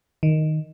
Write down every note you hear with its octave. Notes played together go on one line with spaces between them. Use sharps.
D#3